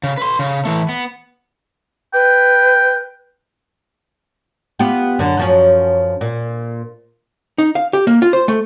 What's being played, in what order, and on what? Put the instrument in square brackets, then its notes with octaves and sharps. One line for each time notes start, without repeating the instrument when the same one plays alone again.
[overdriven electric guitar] C#3
B4 C6
C#3
E3 A3
B3
[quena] B4 [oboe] G5
[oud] B3 F4 G4
F#2 D3
F#2 F3 C#4
A#2
[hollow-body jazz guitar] D#4
F5
G4
A#3
F4
C5
A3